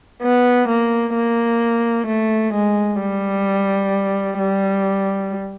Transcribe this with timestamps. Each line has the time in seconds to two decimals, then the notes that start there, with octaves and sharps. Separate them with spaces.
0.22 B3
0.69 A#3
1.15 A#3
2.07 A3
2.54 G#3
3.00 G3
4.39 G3